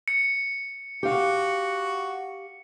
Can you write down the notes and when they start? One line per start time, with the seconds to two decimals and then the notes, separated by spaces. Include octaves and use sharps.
0.08 C#7
1.03 F#4 G4 F5